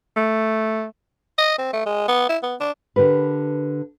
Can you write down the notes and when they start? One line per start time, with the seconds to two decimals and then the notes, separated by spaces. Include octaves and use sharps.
0.16 A3
1.38 D#5
1.58 C4
1.73 A3
1.86 G#3
2.08 B3
2.29 E4
2.43 B3
2.60 D4
2.96 D3 G4 A#4 B4